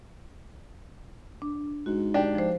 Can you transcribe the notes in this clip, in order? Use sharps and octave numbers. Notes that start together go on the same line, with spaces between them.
D4
G#2 F#4
D4 G4
F3 C5